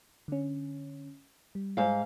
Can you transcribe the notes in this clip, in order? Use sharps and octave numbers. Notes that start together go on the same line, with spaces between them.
D3 C#4
G3
G#2 F5